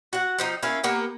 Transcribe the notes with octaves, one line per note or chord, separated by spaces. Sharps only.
F#4 F#5
F3 C4 D#4
A#3 C#4 E4 F5
A#3 B3 G4